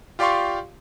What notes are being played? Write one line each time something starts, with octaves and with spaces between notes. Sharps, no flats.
F4 G4 D5 F5 C6 C#6